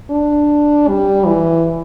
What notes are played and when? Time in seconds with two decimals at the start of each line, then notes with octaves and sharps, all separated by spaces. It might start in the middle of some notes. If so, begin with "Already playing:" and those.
0.10 D4
0.88 G3
1.26 E3